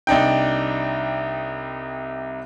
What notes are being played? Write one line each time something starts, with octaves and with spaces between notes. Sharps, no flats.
C2 D4 D#4 G5